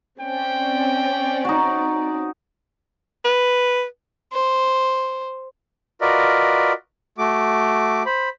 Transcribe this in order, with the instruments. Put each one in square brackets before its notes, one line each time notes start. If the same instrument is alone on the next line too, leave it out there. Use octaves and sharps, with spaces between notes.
[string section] C4 C#4 D5 [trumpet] G5
[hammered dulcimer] D#4 F#4
[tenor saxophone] B4
[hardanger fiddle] C5
[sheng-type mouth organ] F4 F#4 A#4 B4 D5 D#5
A3 F#4 D6
C5 B5